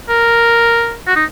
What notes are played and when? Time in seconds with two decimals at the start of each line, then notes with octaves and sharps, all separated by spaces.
0.09 A#4
1.07 F#4
1.16 D#4